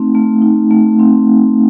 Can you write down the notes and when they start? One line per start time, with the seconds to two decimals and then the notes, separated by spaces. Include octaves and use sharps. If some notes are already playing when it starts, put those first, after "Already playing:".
Already playing: A3 C4 D#4
0.15 A3
0.42 D#4
0.71 A3
1.00 C4